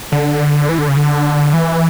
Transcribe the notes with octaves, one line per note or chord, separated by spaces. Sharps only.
D3
E3
D3
C#3
D3
E3